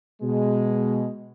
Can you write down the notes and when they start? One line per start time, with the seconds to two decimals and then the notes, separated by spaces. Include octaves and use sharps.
0.21 B2 G#3